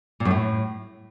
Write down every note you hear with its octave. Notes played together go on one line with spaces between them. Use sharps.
A#2
F#2
A2